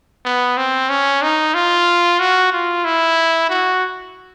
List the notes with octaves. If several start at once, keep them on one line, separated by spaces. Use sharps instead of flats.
B3
C4
C#4
D#4
F4
F#4
F4
E4
F#4